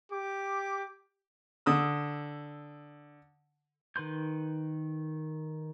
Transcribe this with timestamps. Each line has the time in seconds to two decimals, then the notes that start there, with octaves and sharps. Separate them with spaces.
0.12 G4 D6
1.66 D3 D#6 E6
3.96 D#3 B4 C6 G6